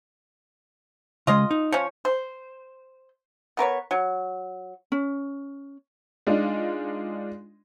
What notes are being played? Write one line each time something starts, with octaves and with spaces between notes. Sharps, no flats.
C#3 G#3 F4 D#5
D#4
F3 C#4 C#5
C5
B3 A#4 B4 C#5
F#3
C#4
G#3 D4 D#4 F4